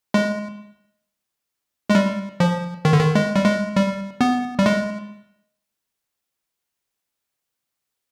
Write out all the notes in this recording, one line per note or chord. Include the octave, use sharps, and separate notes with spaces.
G#3
G#3
G3
F3
D#3
D3
D#3
G#3
G3
G#3
G3
B3
G3
G#3